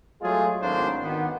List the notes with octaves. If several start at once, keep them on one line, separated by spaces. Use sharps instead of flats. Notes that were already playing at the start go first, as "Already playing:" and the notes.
F#3 G#3 A3 F4 G#4
G#1 A2 F#3 A#3 D4 C5
D#3 B3